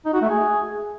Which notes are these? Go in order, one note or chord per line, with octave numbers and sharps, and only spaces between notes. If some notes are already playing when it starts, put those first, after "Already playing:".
D#4
F#4
A3
G#4